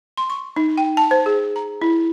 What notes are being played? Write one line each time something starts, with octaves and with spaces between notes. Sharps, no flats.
C6
C#6
D#4
G5
A5
C5
G#4
A#5
E4